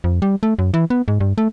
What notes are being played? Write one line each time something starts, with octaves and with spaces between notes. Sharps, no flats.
F2
G3
A3
F#2
E3
B3
G#2
G2
A3